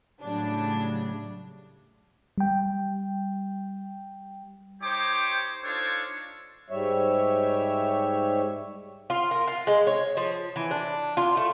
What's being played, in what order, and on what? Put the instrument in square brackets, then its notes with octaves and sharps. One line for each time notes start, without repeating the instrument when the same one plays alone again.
[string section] A2 C#3 F#3 G3 D4
[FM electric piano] G3 G5
[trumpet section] D#4 G4 C5 C#5 G5 D6
D4 D#4 F4 A4 C5 C#5
[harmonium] G#2 G3 C#5 E5
[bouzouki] F4
A#4
F4
G#3
C#5
F3
E3
D4
F4
A3